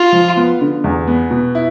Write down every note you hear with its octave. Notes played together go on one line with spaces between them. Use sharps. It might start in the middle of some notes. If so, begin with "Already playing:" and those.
Already playing: F4
F3
B3
D3
E2
B3
B2
E4